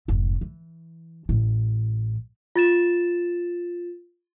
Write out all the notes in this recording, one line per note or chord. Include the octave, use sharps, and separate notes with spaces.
F1 G#2
E3
A1 E4
F4 A6 E7